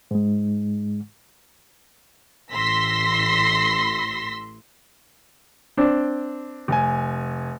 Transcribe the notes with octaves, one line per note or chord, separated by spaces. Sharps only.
G#2 G#3
A1 C6 E6 A#6 B6
C4 D4
F1 G#5